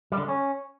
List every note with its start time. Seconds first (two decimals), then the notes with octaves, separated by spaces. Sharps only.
0.12 G3
0.17 D3
0.23 G#3
0.28 C#4